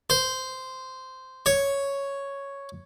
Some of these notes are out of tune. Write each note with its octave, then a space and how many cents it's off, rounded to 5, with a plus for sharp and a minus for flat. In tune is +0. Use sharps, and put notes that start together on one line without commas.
C5 -10
C#5 +0